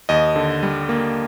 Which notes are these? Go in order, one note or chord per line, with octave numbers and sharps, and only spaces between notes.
D#2 D#5
D3
G3
A#3